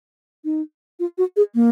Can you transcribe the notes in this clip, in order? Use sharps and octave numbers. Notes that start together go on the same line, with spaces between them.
D#4
F4
F#4
G#4
A#3